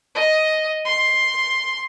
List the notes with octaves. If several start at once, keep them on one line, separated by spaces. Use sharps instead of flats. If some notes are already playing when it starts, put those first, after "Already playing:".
D#5
C6